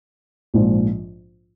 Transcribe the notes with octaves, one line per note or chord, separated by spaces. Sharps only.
A#1 G#2 F3